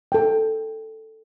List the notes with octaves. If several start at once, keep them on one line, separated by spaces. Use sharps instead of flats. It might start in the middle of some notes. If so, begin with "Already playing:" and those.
A4 G5